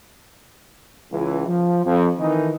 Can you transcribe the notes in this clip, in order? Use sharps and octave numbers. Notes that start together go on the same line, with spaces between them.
C#2 E3
F3
F2
D#3 E3 A3 D#4